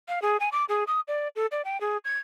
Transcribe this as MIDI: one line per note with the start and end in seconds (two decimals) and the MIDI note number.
0.08 0.22 77
0.22 0.37 68
0.40 0.49 80
0.52 0.65 86
0.69 0.84 68
0.87 1.00 87
1.08 1.28 74
1.36 1.46 69
1.52 1.62 74
1.65 1.80 79
1.81 1.97 68
2.05 2.18 92